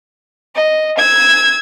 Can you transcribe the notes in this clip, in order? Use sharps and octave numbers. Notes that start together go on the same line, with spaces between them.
D#5
E6 G#6